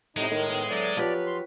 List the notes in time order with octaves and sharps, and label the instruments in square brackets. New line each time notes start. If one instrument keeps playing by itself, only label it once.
[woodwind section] A2 [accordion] C3 D#4 A#5 [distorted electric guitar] G#3
[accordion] D#3 [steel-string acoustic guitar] D#4 A#4
[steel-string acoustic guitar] B3
[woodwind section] A2 D3 F#3 [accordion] D5
[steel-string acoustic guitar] F3 G4 C#5 [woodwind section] F#3 B4
[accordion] C6